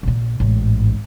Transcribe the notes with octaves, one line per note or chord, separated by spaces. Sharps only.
A#1 A#2
A1 G#2